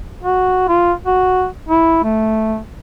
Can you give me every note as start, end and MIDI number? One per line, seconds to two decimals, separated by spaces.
0.23 0.67 66
0.68 0.93 65
1.06 1.46 66
1.69 2.00 64
2.04 2.59 57